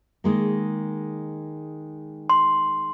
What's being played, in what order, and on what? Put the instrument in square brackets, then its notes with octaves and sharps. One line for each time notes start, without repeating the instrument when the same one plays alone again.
[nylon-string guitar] D#3 G#3 A#3
[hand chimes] C6